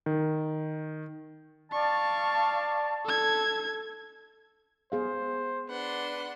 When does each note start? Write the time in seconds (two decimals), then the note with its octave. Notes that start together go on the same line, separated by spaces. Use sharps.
0.06 D#3
1.72 D5 F5 A5 C#6
3.05 A4 G#6
4.92 B3 G#4 C5 F5
5.69 D4 B4 F#5 C6